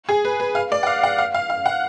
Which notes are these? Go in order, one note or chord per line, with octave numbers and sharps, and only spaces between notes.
G#4
B4
B4
F5
D5
F#5
F5
F#5
F5
F5
F5
F#5